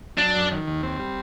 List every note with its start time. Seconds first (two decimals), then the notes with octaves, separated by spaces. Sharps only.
0.19 F#3 D4
0.36 F#2
0.51 D#3
0.67 D#2
0.83 C4
0.99 G3